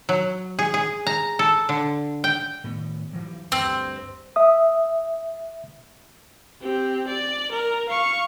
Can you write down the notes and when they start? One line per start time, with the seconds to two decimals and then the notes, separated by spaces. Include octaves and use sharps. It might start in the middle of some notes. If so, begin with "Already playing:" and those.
0.09 F#3
0.59 G#4
0.74 G#4
1.07 A#5
1.39 A4
1.69 D3
2.24 G5
2.64 A2 D#3 B3
3.13 G2 E3 F#3
3.52 D2 G2 C4
4.36 E5 D#6
6.61 C4 G4
7.08 D5
7.52 A#4
7.89 F5 C#6